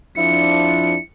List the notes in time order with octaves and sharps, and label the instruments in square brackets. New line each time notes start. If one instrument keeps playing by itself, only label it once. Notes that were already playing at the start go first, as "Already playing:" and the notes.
[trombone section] F2 F3 D4 [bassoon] E4 [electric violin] C#7